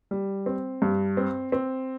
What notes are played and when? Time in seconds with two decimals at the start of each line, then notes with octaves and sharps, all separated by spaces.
0.11 G3
0.46 C4
0.82 G2
1.17 C4
1.52 C4